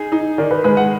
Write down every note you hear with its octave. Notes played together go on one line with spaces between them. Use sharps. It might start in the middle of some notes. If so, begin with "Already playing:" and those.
Already playing: D#4 G#4
D#4
D#3 D5
B4
G#3 B4
F#5